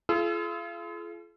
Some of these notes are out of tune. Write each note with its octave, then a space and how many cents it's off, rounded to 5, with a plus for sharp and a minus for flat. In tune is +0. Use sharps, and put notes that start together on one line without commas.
F4 -35 G#4 +45 E6 +35